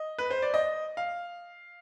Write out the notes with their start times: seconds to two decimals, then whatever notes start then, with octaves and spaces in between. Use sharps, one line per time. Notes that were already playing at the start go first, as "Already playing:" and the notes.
Already playing: D#5
0.18 B4
0.31 C5
0.42 D5
0.54 D#5
0.97 F5